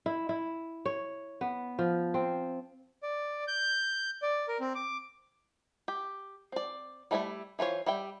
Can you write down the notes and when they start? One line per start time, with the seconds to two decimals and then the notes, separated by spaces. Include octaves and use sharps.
0.06 E4
0.29 E4
0.85 C#5
1.41 B3
1.79 F3
2.14 C4
3.03 D5
3.48 G6
4.22 D5
4.48 A#4
4.60 C4
4.75 D6
5.88 G4
6.52 C4 D5
7.11 G3 A3 E4 D5 E5
7.59 E3 F4 C5 C#5
7.86 G3 E5 G5